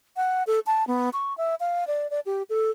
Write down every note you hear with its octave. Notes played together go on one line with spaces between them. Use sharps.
F#5
A4
A5
B3
C#6
E5
F5
D5
D5
G4
A4